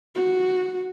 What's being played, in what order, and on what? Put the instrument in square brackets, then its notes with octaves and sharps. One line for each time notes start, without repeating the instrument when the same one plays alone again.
[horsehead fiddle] F#4